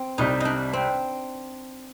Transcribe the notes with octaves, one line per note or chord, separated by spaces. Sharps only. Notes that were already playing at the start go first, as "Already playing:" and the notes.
Already playing: C4
C2 C3 G3 D#4
D4 D#4
C4